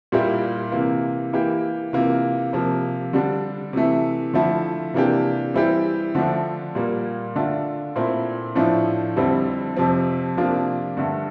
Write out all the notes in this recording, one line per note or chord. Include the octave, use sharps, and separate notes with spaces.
A#2 G3 A#3 E4 G4
C3 E3 A#3
E3 A#3 E4 G4
C3 E3 A#3 F4
C3 F3 A#3
D3 G3 D4
C3 E3 A3
D3 F3 A3 E4
C3 E3 A#3 D4 G4
E3 G3 C4 E4 G4
D3 F3 A3 D4
A#2 G3 A#3
D3 A3 D4 F4
A#2 A3 C4 E4
A2 F3 A3 D4 F4
F2 D3 G3 C4 E4
F2 C3 F3 C4
C3 F3 A#3 D4 F4
G2 D3 A3